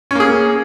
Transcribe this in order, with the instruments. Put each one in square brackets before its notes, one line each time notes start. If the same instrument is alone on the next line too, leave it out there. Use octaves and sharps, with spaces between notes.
[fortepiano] C#4
A#3
G#4